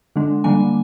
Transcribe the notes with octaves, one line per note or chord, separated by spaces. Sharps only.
D3 G#3 D4
D3 G3 A#3 D4 G#5